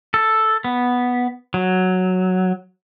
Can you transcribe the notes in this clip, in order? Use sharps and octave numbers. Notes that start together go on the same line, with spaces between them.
A4
B3
F#3